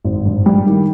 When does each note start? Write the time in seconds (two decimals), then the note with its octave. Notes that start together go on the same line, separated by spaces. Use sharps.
0.04 G#1
0.26 G2
0.46 G3
0.66 D#3